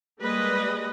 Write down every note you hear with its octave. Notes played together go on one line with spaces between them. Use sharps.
G3 G#3 A#3 B4 D#5